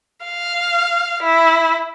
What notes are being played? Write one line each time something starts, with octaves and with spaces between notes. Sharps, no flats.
F5
E4